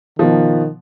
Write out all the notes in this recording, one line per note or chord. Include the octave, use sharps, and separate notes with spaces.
B2 D#3 F3